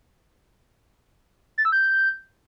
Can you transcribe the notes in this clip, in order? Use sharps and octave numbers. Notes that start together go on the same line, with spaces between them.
A6
E6
G6